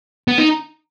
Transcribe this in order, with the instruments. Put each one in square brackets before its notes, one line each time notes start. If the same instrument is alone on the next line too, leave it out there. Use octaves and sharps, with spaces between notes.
[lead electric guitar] B3
D#4